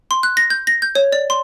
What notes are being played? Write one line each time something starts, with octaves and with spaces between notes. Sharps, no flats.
C6
F#6
A#6
G6
A#6
G6
C#5
D5
C6